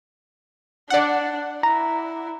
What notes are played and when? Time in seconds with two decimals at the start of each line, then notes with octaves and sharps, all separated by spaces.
0.90 D4 D5 F#5
1.63 E4 A#5